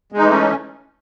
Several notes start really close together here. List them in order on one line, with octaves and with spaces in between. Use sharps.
G#3 D#4 E3 A3 C#4